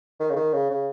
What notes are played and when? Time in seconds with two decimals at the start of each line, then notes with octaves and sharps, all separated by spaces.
0.20 D#3
0.30 C#3
0.36 D#3
0.53 C#3
0.70 C#3